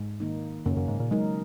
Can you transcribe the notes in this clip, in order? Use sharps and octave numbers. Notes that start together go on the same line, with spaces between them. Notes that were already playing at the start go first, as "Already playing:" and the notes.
Already playing: G#2
D#3 A#3 D#4
F#2 C#3 A#3 C#4
F#2
G#2
A#2
F#3 G#3 D#4 A#4